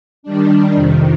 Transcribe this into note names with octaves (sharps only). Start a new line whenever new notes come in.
D#3 G3 D4
F2 C3 D#3